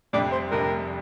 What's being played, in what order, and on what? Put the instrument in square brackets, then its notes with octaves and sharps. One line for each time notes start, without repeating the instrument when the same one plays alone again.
[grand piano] F1 F2 C3 G3 D4 [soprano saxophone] D5
[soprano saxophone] C5
[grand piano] F1 F2 C3 G3 D4 [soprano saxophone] A#4